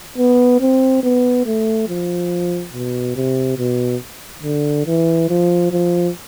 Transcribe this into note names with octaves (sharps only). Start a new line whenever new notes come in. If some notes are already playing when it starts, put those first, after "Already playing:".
B3
C4
B3
A3
F3
B2
C3
B2
D3
E3
F3
F3